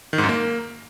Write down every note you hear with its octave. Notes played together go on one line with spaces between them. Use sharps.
D#3
G#2
F#2
A#3